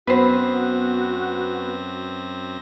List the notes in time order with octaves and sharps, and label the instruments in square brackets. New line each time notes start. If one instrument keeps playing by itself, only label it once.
[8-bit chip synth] F#2 C4 A#6 [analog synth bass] B3 [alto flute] F#4 [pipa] B4 C5